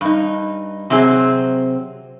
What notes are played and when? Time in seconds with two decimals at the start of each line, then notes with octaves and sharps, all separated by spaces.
0.01 G2 D#4
0.90 C3 F#3 C4 G#4